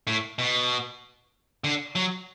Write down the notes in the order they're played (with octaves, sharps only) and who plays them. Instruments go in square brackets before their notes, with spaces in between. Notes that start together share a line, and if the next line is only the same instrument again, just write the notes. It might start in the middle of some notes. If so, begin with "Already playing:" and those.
[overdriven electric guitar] A2
B2
D3
F#3